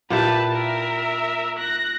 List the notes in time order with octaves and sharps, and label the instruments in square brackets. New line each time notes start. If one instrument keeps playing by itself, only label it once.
[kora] A#2 E4 G4 [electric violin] B4 A5
[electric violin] A#4 E5
F#6 A#6